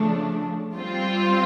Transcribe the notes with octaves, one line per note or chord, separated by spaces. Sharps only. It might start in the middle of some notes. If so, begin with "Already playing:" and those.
Already playing: C#3 F3 A3 D4
G3 C4 F4